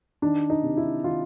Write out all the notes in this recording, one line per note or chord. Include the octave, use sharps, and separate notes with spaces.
D#3 D4
D#4
C3
E4
D#3 F4